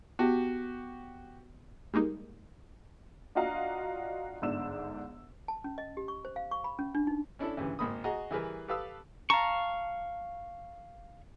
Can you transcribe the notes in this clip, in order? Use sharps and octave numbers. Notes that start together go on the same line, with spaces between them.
B3 F#4 G4
G3 G#3 A#3 D#4
D4 F4 F#4 D#5 F5 A#5
G1 G#2 D4 E6 E7
A5
C#4
D#5
G4
C#6
C5
F5
C#6
B5
C#4
D4
D#4
C#4 D4 E4 A4
D2 G2 C#3 E3
G#1 A#3 B5 D#6
F#4 G#4 D#5 A#5
E3 G3 G#4 A#4 B4
G4 A4 B4 F5 D#6 E6
F5 A5 A#5 C#6